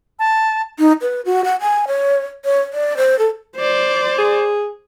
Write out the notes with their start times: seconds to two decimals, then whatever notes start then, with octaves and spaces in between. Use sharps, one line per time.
0.19 A5
0.79 D#4
1.01 B4
1.25 F#4
1.44 F#5
1.61 G#5
1.87 C#5
2.45 C#5
2.73 D5
2.97 C5
3.19 A4
3.56 C5 D5
4.18 G#4